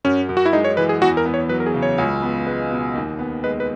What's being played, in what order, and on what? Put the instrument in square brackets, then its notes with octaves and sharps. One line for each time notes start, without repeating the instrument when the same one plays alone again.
[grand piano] F#2 [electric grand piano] C#4
[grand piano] F#2
[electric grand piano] F#4
E4
[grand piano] G#3 [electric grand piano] D#4
[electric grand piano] C#5
[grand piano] E3 [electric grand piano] B4
[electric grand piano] G#4
[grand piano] E2 [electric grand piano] F#4
[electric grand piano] A#4
[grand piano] B3
[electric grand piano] C#5
[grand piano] F#3 [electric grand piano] B4
[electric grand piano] A#4
G#4
[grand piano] C#3
[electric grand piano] C#5
[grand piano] C#2
B3
[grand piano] G#3 [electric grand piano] B4
[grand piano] B2
D#2
B3
[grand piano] G#3 [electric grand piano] B4
[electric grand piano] B4